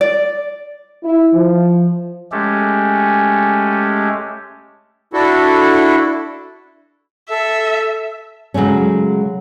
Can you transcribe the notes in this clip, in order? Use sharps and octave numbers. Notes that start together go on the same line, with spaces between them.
D5
E4
F3
G#3 A3 C#4 G4 A4
D4 E4 F#4 A4
A4 E5
C#3 F#3 G#3 A3 C#4